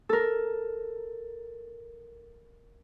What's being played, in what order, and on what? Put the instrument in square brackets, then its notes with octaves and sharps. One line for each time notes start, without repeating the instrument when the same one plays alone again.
[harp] A4 A#4